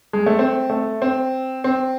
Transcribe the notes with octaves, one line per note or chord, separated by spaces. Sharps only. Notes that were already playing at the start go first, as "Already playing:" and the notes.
G#3
A3
C4
A3
C4
C4